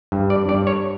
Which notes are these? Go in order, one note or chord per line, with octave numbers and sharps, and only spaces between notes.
G2
D5
G2 D5
C#5